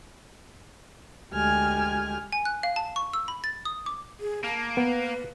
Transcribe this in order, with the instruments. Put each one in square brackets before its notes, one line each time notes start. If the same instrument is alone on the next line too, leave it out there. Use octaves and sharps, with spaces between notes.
[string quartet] D2 G#3 G4 G#5 F6 G#6
[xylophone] G#5
F#6
F5
A5
C#6
E6
B5
A6
D#6
D6
[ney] G#4
[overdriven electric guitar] A#3 [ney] A5
[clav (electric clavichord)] B3 [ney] B4